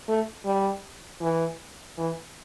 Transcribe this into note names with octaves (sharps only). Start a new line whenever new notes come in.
A3
G3
E3
E3